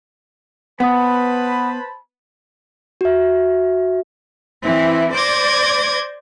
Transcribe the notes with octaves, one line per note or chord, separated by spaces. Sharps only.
B3 B4 C5 F#5 A5 B5 D#6
F#4 E5
E3 C4 E4
C5 D5 D6 G6 G#6 A#6